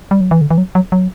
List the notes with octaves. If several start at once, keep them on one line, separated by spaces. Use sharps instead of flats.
G3
F#3
E3
D3
E3
F#3
F#3
F#3